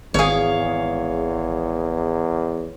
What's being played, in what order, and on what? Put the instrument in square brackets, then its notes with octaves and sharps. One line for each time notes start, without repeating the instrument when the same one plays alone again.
[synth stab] G#1 G#4 [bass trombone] E2 [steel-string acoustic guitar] C#5 F5